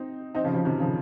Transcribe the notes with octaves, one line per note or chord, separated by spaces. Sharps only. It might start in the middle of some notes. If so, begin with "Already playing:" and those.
Already playing: C4 D#4
C4 D#4
C#3 F3
C#3 F3
C3 D#3
C#3 F3